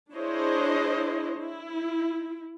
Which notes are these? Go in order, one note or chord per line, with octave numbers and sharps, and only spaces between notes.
D4 E4 G#4 C5 C#5 D#5
E4